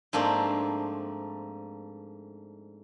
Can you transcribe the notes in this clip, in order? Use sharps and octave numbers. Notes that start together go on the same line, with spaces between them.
G#2 F3 A3 A#3 C4 D4